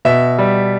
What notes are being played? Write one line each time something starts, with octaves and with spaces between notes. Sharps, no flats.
B2 E5
G3